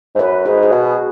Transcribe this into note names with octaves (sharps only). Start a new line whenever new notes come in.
G#2
F#2 F#4 B4
G#2 D#4 G#4
G#4
B2 F#4 B4